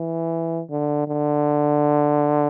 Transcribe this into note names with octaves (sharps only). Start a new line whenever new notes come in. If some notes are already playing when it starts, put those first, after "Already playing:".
Already playing: E3
D3
D3